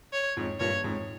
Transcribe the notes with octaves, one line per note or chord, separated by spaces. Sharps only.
C#5
F2 G#2
G2 A#2 C#5
F2 G#2